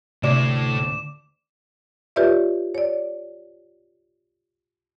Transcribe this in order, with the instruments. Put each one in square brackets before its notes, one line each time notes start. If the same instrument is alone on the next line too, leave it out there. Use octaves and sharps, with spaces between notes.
[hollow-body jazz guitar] D2 D5 [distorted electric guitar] A2 [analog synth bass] C3 [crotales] D6 E7
[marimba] F4 G4 B4 C#5 D5 E5
C#5 D5